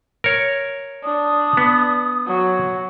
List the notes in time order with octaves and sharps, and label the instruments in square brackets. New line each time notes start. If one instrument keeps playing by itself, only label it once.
[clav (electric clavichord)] A#4 C#5
[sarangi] D4 [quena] D#6
[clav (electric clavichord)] B3
[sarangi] F#3